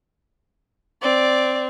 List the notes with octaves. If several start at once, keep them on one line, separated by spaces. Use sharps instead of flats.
C4 D5